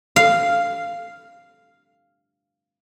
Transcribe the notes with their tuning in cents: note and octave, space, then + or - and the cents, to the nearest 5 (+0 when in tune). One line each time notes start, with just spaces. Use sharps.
F5 -5